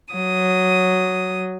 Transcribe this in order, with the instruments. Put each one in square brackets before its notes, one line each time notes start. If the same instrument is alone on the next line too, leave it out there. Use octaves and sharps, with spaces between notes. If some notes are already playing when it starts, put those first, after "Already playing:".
[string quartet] F#3 D#6